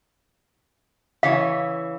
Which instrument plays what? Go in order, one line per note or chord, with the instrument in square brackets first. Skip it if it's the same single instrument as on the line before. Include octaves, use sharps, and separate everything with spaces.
[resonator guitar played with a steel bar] C#3 E3 C#5 [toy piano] F5